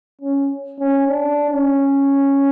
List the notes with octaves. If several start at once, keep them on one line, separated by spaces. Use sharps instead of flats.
C#4
C#4
D4
C#4